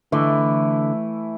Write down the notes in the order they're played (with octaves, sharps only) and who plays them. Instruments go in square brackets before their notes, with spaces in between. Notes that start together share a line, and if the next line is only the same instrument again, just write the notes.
[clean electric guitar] D3 [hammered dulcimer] E3 A3 E4